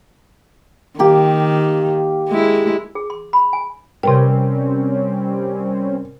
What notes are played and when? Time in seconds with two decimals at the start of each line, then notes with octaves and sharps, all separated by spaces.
0.99 D#3 A#3 G4
2.28 G#3 E4
2.95 G#4
3.10 C6
3.33 B5
3.53 G#5
4.03 C3 G3 C4 C#4 A#4 B4 G5